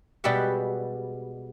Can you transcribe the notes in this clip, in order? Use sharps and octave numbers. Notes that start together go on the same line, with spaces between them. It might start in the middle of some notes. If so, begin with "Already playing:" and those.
B2 G3 G#3 G4 E5 F#5